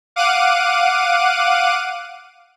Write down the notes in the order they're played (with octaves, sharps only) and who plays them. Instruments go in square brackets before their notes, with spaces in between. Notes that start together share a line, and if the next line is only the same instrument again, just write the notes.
[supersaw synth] F5 F#5 D6 F#6 D#7